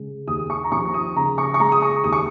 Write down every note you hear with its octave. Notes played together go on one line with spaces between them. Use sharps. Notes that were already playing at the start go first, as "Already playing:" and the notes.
Already playing: C#3 G#3
D#2 D#6
C#6
A#5
F3 C#6
D#6
C#3 A#5
C#6
C#6
G#3 A#5
D#6
C#6
D#2 D#6
C#6